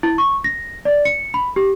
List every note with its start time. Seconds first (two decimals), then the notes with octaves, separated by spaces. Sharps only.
0.03 E4
0.18 C#6
0.44 A#6
0.85 D5
1.05 C#7
1.34 B5
1.56 G4